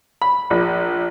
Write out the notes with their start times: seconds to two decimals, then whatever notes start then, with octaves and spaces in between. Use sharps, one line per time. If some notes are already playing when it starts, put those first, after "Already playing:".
0.22 B5
0.50 A#1